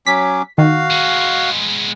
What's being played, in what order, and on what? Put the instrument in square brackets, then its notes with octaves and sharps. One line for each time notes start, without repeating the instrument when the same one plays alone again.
[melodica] F#3 C#4 D6 [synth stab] B6
[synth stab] D#3 [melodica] F#4 F5
[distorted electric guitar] G#3 B3